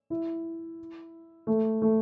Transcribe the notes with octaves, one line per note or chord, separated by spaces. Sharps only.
E4
A3
A3